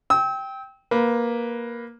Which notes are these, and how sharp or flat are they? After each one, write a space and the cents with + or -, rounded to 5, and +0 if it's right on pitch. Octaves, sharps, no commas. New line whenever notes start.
G5 +0 E6 -35
A#3 +10 B4 +0